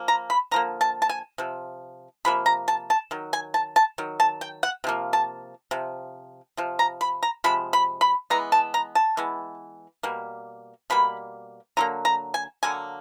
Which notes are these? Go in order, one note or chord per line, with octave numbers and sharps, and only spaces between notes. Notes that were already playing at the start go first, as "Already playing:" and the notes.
Already playing: F3 A#3
A#5
B5
D3 F3 A#3 A#5
A5
A5
G#5
C3 F3
C3 F3 A#3 B5
A#5
A5
A5
D#3 F#3
G#5
A5
A5
D#3 F#3
A5
G5
F#5
C3 F3 A#3
A5
C3 F3
C3 F3
A#5
B5
A#5
C3 F3 G#3 B5
B5
B5
E3 G#3 B3 A#5
A5
A#5
A5
E3 G#3 B3
B2 G3 A#3
B2 G3 A#3 B5
D3 F#3 A#3 A#5
A#5
G#5
D3 F#3 A#3 G#5